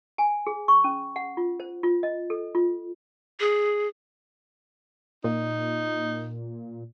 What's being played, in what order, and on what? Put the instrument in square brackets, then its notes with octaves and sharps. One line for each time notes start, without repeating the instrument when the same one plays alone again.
[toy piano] G#5
G#4
C#6
C#4
F#5
F4
C5
F4
D#5
A4
F4
[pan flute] G#4
[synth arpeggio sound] A#2 [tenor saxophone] D#4